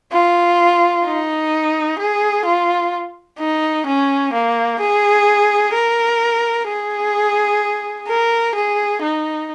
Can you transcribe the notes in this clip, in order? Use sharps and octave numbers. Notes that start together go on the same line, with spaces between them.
F4
D#4
G#4
F4
D#4
C#4
A#3
G#4
A#4
G#4
A#4
G#4
D#4